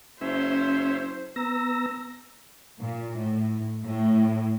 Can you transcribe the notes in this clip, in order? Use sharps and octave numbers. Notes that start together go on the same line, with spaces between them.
F#1 C#4 C5 E5
B3 A#5 E6 A#6
A#2
A2
A2